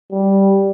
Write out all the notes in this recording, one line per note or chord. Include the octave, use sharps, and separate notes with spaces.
G3